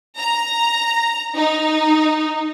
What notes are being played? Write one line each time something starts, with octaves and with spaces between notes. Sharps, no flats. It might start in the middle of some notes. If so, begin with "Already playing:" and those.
A#5
D#4